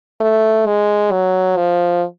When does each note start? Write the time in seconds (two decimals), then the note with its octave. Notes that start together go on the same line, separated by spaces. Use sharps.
0.21 A3
0.66 G#3
1.12 F#3
1.57 F3